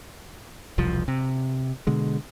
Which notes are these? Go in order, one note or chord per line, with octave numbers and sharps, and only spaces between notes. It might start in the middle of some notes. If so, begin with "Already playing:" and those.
E1 C2 F3
C3
B2 D3 G#3